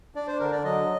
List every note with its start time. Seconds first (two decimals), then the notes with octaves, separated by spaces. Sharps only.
0.15 D4 D5
0.27 C5
0.40 D3 A#4
0.52 D5
0.64 F#3 D#5